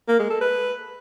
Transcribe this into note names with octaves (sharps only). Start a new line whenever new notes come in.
A#3
G#3
A4
B4